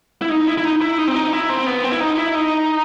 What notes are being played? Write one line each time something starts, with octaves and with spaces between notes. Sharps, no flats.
E4
D#4
E4
E4
D#4
E4
D#4
C4
D#4
E4
C4
B3
C4
E4
D#4
E4
D#4